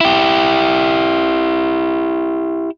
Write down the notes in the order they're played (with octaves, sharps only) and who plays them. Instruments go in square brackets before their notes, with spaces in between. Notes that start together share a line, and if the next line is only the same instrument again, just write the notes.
[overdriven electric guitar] E4 G4